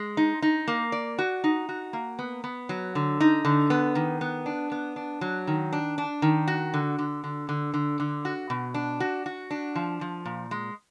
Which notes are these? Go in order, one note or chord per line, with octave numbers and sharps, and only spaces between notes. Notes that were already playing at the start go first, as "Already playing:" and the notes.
Already playing: G#3
D#4
D#4
A#3
D5
F#4
D#4
F#4
A#3
B3
B3
F#3
D3
D#4
D3
B3
D#3
B3
D4
B3
D4
F#3
D#3
D4
D4
D#3
F#4
D3
D3
D3
D3
D3
D3
F#4
B2
D4
F#4
F#4
D4
F3
F3
A#2
G#3